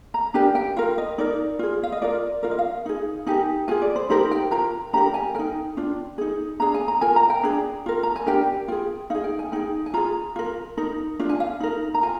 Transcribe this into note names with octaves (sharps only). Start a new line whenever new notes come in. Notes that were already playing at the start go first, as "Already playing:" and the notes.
A#5
D4 G4 A#4 G#5
G5
F4 A#4 F5
D#5
D#4 A#4 D5
F4 G#4
F5
D#5
F4 A#4 D5
F4 A#4 F5
D#5
F5
D#4 G#4
D#4 G4 A#4 G#5
F4 G#4 G#5
D5
C5
D#4 G4 A#4 C5
G5
F4 A#4 A#5
D4 G4 A#4 A#5
G#5
D#4 A#4 G5
D4 F4
D#4 G#4
D4 G#4 A#5
G#5
A#5
F4 A#4 G#5
A#5
G5
D4 G#4
F4 A#4
A#5
G#5
D4 G4 A#4 G5
F4 G#4 G5
D#4 G#4 F5
G5
G#5
D#4 G#4 G5
G#5
F4 G#4 A#5
F4 A#4
D#4 A#4
D4 F4
G#5
F5
D#4 A#4
A#5
F4 G#5